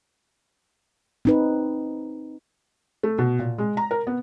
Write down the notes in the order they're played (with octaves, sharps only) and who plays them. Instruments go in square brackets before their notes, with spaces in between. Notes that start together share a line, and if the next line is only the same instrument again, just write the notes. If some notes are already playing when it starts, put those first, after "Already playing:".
[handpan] C4 D#4 B4
[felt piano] A3
B2
A#2
G#3
A#5
A#4
B3